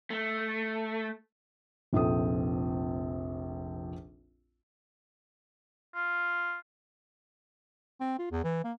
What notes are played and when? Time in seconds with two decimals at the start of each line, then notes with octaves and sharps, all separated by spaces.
0.10 A3
1.93 F1 A#1 F3 C4 A4 D#6
5.95 F4
8.00 C4
8.18 F4
8.31 E2
8.44 E3
8.64 A#3